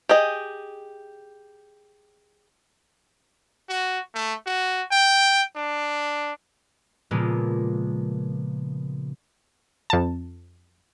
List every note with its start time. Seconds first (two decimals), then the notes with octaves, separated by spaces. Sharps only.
0.09 G4 G#4 D#5
3.69 F#4
4.15 A3
4.47 F#4
4.91 G5
5.56 D4
7.11 A#2 C#3 F3 G#3 A#3 B3
9.90 F2 A5